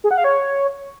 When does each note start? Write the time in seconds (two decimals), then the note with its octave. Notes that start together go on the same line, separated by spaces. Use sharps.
0.04 G#4
0.11 F#5
0.18 F5
0.24 C#5